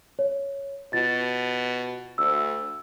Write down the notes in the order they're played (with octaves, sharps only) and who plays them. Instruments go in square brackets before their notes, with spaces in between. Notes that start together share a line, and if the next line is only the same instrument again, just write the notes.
[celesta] C#5
[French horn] B2 [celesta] F4 A6
[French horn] D2 [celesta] E6